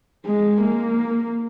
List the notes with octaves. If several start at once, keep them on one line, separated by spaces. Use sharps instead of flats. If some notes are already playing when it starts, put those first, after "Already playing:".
G#3
A#3